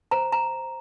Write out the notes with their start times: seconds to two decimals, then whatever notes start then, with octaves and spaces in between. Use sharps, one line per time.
0.11 C5 A#5
0.32 A#5